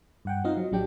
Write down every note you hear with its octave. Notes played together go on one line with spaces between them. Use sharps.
G2 F#5 G5
C4 D#4 F4 D#5 F5
F#3
A1 F#3 D4 G4 G5